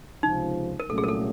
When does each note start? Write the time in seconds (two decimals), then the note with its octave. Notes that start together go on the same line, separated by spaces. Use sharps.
0.23 C#2 C3 F3 D#4
0.80 A#4
0.88 C2 A#2 F#3 A3 C#4 A4
0.98 G#4
1.04 A#4
1.08 A4